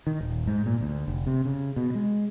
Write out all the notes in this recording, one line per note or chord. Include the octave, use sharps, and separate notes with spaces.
D#3
D#1
G#2
A#2
D2
F1
C3
C#3
B2
G#3